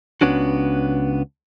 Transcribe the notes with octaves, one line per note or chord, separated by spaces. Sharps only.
C#2 B3 C#4 D4 F#4